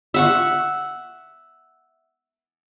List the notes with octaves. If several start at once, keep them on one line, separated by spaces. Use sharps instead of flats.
E5 F#5 C#6